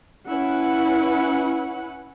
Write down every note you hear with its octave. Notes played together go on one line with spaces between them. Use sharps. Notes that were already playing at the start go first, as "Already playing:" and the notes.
C#4 E4 B4 F#5